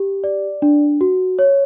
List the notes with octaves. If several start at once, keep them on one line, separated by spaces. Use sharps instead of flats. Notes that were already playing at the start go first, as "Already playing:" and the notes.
Already playing: G4
D5
D4
F#4
C#5